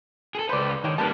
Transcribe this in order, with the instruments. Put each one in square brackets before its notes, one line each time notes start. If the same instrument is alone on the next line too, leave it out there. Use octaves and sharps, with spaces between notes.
[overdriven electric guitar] G#4 A4
[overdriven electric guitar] C#2 B4 [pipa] C5 D5
[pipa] D3 G4 C#5 [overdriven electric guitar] D#3
[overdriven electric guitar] G3 A#3 [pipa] B3 D#4 A5